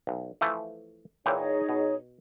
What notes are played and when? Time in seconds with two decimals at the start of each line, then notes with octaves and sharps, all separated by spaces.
0.07 B1
0.41 E3 F3 A3
1.26 A#2 E3 D#4 G#4 C#5 G5
1.69 B2